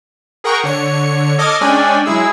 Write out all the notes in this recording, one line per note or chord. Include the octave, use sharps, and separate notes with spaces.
G#4 A#4 F#5 G5 A#5 C#6
D3 C#5 C#7
A4 D#5 D6 D#6 F6 G#6
G#3 C#4 D4 D5 G5 G#5
F#3 G#3 E4 G#4 E6